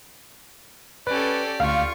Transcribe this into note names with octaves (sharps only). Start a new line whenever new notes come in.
C#4 G4 A4 B4 D5
D2 F4 F5 C#6